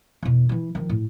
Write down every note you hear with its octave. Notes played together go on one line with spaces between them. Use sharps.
E2 B2
E3 E4
D#3 F3
A2